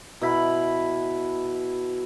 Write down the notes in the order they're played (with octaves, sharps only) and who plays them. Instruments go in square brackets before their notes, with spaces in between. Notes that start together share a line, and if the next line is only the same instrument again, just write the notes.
[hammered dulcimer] B2 E4 B5